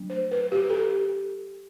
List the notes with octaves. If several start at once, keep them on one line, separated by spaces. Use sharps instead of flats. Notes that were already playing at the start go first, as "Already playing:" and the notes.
Already playing: F#3 A3 D4
C5
B4
G4
A4
G4